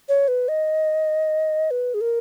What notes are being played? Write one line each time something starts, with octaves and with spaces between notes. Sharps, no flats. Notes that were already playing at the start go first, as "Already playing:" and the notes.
C#5
B4
D#5
B4
G#4
A#4